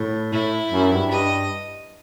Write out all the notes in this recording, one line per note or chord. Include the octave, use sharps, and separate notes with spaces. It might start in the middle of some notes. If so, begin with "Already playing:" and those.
Already playing: A2
A2 E4
F#2
G2
G2 D#5